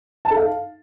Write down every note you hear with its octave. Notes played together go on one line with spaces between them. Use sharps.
A5
A4
F5